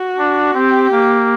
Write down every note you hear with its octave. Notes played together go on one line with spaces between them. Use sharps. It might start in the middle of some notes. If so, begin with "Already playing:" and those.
Already playing: F#4
D4
C4 G4
A#3